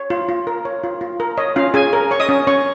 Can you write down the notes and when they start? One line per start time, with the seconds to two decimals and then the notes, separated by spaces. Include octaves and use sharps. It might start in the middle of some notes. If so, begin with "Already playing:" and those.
Already playing: C#5
0.10 F4
0.29 F4
0.47 A#4
0.65 C#5
0.84 F4
1.01 F4
1.20 A#4
1.38 C#5 D#5
1.56 C#4 F4 F5
1.74 C#4 G#4 G#5
1.93 A#4
2.11 C#5 C#6
2.20 D#5 D#6
2.29 C#4
2.47 C#4 C#5 C#6